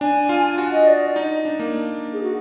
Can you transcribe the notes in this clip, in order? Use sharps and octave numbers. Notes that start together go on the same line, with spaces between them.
D4 G#5
F4
F#4
D#5
D5
D#4
D4
A#3
G#4
F#4